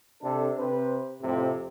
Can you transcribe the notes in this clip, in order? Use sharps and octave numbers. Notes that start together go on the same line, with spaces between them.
C3 D4 A4
C3 C4 B4 C5
F2 A2 C3